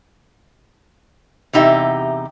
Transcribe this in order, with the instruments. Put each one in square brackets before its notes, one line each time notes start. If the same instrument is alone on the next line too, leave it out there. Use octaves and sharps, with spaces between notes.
[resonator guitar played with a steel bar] E2 C3 D#4 G4 E5